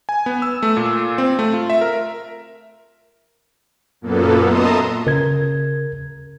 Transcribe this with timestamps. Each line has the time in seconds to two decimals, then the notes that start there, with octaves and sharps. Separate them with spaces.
0.09 G#5
0.26 B3
0.42 E6
0.63 A3
0.77 A#2
1.18 C4
1.39 A3
1.53 F4
1.70 E5
1.81 A#4
4.01 F#2 A#2 A#3 B3 A4
4.46 D#5 E5 A5 A#5 C6 D#6
5.07 C#3 A#4 G#6